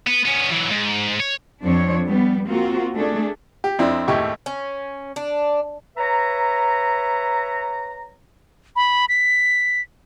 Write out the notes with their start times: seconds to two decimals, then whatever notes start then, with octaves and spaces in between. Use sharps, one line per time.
0.07 B3
0.25 B3 C#4
0.50 E3 F#3
0.70 G#2
1.20 C#5
1.64 F2 F3 C4 D4 C#5
2.06 G3 B3
2.48 A#3 C4 F4 F#4
2.96 A3 D4 G#4 A4
3.64 G4
3.79 F2 C4 D4 E4
4.08 G#1 D#2 A2 E4 G4 C#6
4.46 C#4
5.16 D4
5.97 B4 C#5 E5 A#5
8.76 B5
9.09 B6